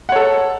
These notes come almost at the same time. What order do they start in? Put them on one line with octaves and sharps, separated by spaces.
F#5 C#5 A4